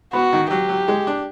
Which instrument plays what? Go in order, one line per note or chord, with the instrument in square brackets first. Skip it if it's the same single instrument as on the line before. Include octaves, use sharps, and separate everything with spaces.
[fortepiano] B3 [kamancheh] F#4
[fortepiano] D#3
[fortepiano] F#3 [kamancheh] G4
[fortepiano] F#3
G#3
D4